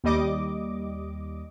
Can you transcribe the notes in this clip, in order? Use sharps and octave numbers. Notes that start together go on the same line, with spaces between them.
D#2 G3 D#5 D6